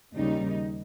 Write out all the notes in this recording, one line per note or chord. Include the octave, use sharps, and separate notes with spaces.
D#2 C#3 G3 D#4